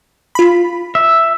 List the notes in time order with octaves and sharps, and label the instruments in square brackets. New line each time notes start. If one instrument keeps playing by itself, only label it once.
[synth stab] F4 B5
[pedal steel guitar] E5